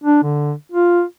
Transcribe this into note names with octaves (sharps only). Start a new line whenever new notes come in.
D4
D3
F4